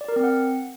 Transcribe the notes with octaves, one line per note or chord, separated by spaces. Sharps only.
D5
A#4
C4
F#5